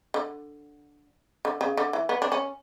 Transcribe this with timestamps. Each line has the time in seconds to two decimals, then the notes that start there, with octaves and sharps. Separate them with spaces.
0.14 D3
1.45 D3
1.61 C#3
1.77 D3
1.93 E3
2.09 B3
2.22 D4
2.32 C#4